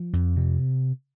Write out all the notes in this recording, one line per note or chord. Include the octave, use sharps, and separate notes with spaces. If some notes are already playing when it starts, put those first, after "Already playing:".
Already playing: F3
F2
C3